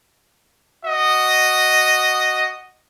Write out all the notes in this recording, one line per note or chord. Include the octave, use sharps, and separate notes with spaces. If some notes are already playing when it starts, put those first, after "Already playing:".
F#4 D#5